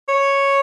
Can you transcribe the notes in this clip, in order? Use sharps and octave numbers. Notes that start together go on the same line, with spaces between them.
C#5